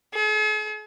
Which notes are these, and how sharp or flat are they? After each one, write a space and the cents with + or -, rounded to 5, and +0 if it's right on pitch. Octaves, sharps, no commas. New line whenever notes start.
G#4 +45